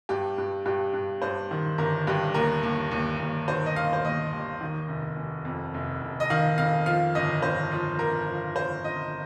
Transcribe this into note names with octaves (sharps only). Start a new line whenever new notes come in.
G2 G4
G2
G2 G4
G2
G2 C5
D#3
G1 A#4
G2 G4
D#2 A#4
D#2
D#2
D#2
D#3 C5
D#5
D#2 F5
C5
D#2 D#5
D#2
D#3
F1
F1
F2
F1
F1
D#5
D#3 F5
F2 F5
F3 F5
G1 D#5
G1 C5
F3
G1 A#4
F3
G1 C5
G1 D#5